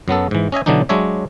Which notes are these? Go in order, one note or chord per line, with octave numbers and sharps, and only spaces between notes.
F#2 F#3 B3 A4
G#2 E3
C#4 D#5 E5 G#5
B2 D3 E3 F#3 D4 D#4
F#3 G#3 D4 C#5 E5